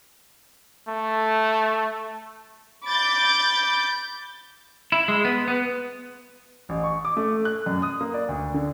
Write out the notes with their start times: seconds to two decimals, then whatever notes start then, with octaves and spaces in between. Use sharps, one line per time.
0.88 A3
2.84 B5 D6 G6 A6
4.92 E4
5.08 G#3
5.25 B3
5.48 B3
6.69 A1
6.84 C#6
7.05 D6
7.17 A3
7.45 F#6
7.66 F#2
7.82 D#6
8.01 A#3
8.14 D5
8.29 D2
8.54 D3